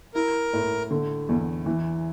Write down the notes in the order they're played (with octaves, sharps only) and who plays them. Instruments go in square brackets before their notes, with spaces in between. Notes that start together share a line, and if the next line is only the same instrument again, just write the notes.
[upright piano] E4 [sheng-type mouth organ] A#4
[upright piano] A2
D3
E2
E3